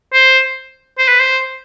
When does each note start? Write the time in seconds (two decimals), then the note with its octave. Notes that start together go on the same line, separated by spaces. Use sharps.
0.13 C5
0.98 C5
1.08 B4
1.20 C5